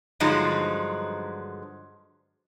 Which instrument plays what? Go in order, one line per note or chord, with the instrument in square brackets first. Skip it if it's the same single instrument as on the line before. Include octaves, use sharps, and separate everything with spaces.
[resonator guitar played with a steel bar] G2 D3 F3 F#3 G#3 D#4